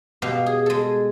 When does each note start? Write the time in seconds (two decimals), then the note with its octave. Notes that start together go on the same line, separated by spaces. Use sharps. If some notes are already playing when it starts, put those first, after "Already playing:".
0.22 B2 G4 F5
0.46 G#4
0.66 G#3 A4